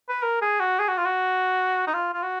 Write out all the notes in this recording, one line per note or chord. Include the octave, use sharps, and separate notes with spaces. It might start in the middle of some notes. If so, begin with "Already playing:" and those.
B4
A#4
G#4
F#4
G#4
F#4
F4
F#4
D#4
F4
F4
F#4